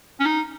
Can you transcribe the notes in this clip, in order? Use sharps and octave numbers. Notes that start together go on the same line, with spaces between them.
C#4
D#4